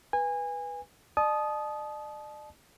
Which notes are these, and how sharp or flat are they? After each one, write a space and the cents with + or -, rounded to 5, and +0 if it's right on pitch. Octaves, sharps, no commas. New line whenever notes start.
B4 -10 G#5 -25
D5 +45 A5 -30 D#6 +0